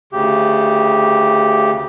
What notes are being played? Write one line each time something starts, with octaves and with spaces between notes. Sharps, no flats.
D2 C#3 G4